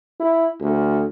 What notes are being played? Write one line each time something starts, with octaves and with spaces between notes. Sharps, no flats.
E4
D2